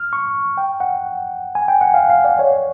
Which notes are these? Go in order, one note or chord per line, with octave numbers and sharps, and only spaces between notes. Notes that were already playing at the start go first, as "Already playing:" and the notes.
Already playing: F6
C#6
G5
F#5
G#5
G5
F#5
F5
F5
D5
C#5